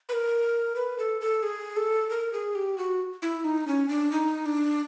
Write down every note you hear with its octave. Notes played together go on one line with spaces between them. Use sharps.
B4
A#4
B4
A4
A4
G#4
A4
A#4
G#4
G4
F#4
E4
D#4
C#4
D4
D#4
D4